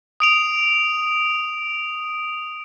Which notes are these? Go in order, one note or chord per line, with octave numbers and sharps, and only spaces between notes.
D#6 D7 F7